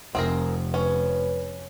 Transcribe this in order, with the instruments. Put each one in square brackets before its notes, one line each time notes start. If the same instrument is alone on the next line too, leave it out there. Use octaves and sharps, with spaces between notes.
[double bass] F1 [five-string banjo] C4 G#4 A#4
[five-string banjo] C#4 [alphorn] B4